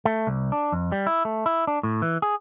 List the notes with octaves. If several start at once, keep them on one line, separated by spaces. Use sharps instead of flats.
A3
C2
D4
F2
G3
E4
A3
E4
D4
A2
E3
G#4